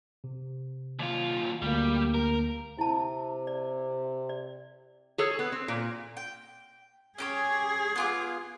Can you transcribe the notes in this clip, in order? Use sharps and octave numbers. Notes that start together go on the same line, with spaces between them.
C3
D#2 F4
D2 G3 A#3
A#4
C3 E4 A5
D5
D5
G#4 A4 C#5
B3
C4
A#2
G5
C#4 G4 G#4 C#5
B3 F4 D6